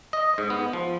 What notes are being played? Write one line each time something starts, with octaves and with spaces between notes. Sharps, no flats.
D#5
G#2
B3
F3